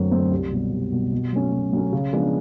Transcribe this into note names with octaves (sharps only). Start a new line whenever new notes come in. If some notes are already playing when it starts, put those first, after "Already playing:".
Already playing: F#2 D3 F#3 A3 C4
D3 F#3 A3 C4
C2
B2 G3
C2
B2 G3
B2
F#3 A3 C#4
B2
F#3 A3 C#4
C#3
F3 G#3 B3 D4